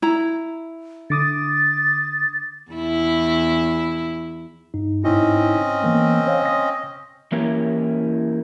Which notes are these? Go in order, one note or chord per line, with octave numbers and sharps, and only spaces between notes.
E4 A#5
D3 D6 D#6 A6
E2 E4
G2 D#4
G#2 C4 C#4 D#4 E4 D#5
E3 A#3 B3
C5 C#5 F5
D#6 A#6
E3 A#3 C#4 E4 G4 A#4